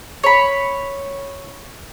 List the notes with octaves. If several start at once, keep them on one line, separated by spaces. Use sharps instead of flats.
C#5 B5